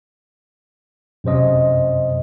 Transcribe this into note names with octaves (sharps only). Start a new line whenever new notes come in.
F#2 C3 C5 D#5